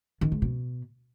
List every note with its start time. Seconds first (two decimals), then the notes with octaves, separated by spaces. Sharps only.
0.21 D#3
0.32 G#2
0.42 B2